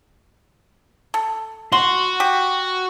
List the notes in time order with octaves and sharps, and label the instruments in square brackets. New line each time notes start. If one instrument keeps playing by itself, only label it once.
[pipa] A4
[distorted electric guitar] F#4 [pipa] C6
[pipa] G4